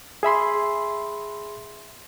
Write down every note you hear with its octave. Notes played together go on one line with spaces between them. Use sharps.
G#4 E5 B5 C6